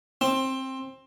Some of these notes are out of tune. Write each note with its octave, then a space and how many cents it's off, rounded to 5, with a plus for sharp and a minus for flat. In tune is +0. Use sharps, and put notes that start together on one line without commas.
C4 +15